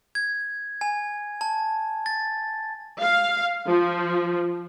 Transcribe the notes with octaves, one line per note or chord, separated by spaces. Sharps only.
G#6
G#5
A5
A6
F5
F3